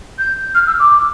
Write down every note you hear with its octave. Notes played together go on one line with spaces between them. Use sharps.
G6
F6
E6
D6